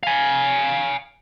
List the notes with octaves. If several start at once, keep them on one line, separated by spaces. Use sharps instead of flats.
F5 G#5